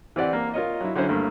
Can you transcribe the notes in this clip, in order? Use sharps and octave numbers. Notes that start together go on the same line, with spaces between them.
E3 C4 G4 D5 F#5
A#3
F4 A#4 C#5 D#5
F#3 E4
D3 F#3 C#4 E4 C5 C#5
G2 A3 A#3